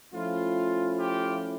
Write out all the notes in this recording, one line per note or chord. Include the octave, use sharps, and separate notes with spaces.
F3 A3 C#4 E4 F4
F4 G4